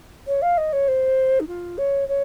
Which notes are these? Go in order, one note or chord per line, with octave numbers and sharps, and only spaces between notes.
C#5
F5
D#5
C#5
C5
D#4
F4
C#5
C#5